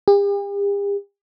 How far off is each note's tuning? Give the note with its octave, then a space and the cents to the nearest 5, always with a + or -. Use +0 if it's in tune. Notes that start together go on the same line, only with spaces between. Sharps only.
G4 +45